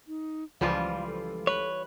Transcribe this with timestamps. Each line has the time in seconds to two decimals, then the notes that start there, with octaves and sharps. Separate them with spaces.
0.08 D#4
0.61 C#2 E3 F3 G3 F4 F5
1.07 A4
1.47 B4 C#5